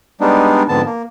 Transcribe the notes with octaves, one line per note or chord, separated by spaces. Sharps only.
G3 G#3 B3 D4 D#4
F2 G#2 D3 B3 A5
A#3